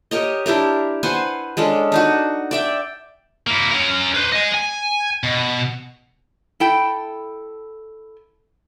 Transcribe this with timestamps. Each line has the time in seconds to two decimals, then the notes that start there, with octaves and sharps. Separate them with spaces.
0.11 G4 A#4 C#5 D#5
0.46 D4 E4 G4 A#4
1.03 B4 C5 F#5 G#5
1.57 G#3 C#4 D4 A4
1.92 D4 D#4 F#4
2.51 D5 E5 G5
3.47 A#3 E4
3.71 C#4 A#4
4.15 B4 C5
4.32 D#5 G#5
4.54 G#5
5.24 B2
6.60 E4 A4 G5